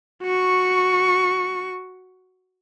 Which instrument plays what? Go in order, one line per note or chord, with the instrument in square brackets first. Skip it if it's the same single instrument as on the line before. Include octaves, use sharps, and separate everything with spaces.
[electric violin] F#4 C#6